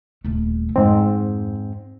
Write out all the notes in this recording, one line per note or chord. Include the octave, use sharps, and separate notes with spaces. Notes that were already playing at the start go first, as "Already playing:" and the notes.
D#1 A3
F2 G#2 C4